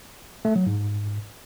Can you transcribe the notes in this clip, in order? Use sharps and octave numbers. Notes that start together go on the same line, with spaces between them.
A3
F#3
G#2